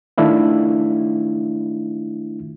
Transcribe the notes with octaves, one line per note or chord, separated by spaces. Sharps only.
D#3 A3 D4 E4 F4